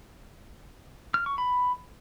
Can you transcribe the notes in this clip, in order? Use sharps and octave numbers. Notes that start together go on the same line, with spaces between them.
F6
C#6
B5